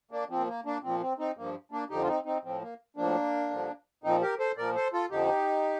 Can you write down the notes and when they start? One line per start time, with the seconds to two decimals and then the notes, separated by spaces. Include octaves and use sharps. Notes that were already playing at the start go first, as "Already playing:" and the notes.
0.11 A#3 D4
0.29 A#2 F3 C4
0.48 A#3
0.65 A#3 D4
0.83 A#2 F3 C4
1.01 C4
1.19 C4 D#4
1.37 G2 F3 A#3
1.72 A#3 D4
1.90 F2 D3 F3 D#4 G4
2.03 F4
2.08 C4 D#4
2.25 C4 D#4
2.44 A2 F3 C4
2.62 A#3
2.97 A2 F3 A#3 D4
3.51 G2 D3 F3
4.04 A#2 F3 C4 D#4
4.22 G4 A#4
4.39 A4 C5
4.57 A#2 F3 A#4 D5
4.75 A4 C5
4.93 F4 A4
5.11 F2 D3 F3 D#4 G4